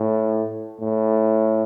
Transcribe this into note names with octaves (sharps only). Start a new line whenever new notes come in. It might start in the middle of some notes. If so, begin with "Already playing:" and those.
Already playing: A2
A2